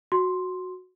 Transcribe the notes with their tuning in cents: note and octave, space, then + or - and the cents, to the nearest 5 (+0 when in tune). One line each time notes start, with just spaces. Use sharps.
F#4 -10 C6 +0